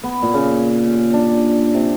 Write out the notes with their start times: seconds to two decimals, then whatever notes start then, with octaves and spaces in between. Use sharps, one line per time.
0.04 B3
0.22 A#2
0.34 C#3
0.88 G4
1.13 D4
1.74 C3